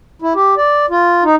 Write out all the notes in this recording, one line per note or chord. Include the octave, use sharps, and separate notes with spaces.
E4
G4
D5
F4
D#4